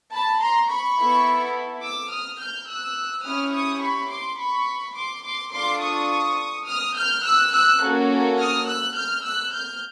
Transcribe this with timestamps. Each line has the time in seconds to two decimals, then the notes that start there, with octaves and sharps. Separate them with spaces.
0.12 A5 B5
0.41 A#5 C6
0.70 B5 C#6
0.98 B3 E4 A4
1.83 D6 E6
2.12 D#6 F6
2.41 F6 G6
2.69 E6 F#6
3.26 C#4 E4 G4 D#6 F6
3.55 C#6 D#6
3.83 B5 C#6
4.11 C6 D6
4.40 B5 C#6
4.97 C6 D6
5.25 C6 D6
5.53 D4 F4 A4 C6 D6
5.82 C#6 D#6
6.68 D#6 F6
6.96 F6 G6
7.25 E6 F#6
7.53 E6 F#6
7.81 A#3 C#4 F#4 A4
8.39 D#6 F6
8.67 E6 F#6
8.95 F6 G6
9.24 E6 F#6
9.53 F6 G6